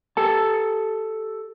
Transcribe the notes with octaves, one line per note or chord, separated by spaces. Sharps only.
G4 A4 A5